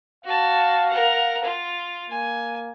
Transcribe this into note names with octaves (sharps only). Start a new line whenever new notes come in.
F#4 F5 A5
A#4 F#5
F4
A#3 G#5